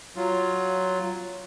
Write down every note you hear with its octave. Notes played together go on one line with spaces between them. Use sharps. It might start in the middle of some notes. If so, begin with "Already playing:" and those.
F#3 F4